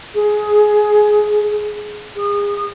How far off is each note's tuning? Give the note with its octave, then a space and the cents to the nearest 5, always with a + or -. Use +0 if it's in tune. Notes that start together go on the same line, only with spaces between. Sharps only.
G#4 +15
G#4 -30